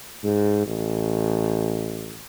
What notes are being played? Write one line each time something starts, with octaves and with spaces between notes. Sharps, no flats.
G#2
A1